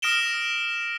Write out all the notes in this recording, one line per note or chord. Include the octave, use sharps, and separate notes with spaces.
D#6 F6 A#6 D7 E7 G7